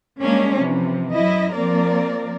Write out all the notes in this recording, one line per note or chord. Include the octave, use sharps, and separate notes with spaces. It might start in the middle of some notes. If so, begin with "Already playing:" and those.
G3 G#3 A#3 C#4 D4
C3 E3 F3
F#2 F#3 E4 D#5
F3 A#3 C4 A#4 D5